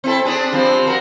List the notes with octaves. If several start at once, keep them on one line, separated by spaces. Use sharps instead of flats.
C4 E4 A4
C4 D4 G#4
F3 G3 C4
F#4 A#4